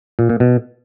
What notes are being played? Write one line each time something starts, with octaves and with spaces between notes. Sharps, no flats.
A#2
A#2
B2